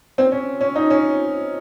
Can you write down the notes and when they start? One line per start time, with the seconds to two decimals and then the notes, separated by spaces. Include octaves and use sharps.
0.18 C4
0.32 C#4
0.61 C#4
0.76 D#4
0.90 C#4